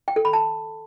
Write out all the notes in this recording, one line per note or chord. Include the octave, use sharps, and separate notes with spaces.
G5
A4
B5
A5